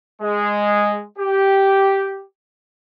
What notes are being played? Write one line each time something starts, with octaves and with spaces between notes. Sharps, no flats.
G#3
G4